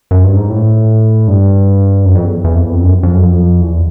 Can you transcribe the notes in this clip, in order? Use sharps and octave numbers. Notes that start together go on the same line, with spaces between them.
F#2
G2
G#2
A2
G2
F#2
F2
E2
E2
F2
E2
F2
F#2
F2
F#2
F2
E2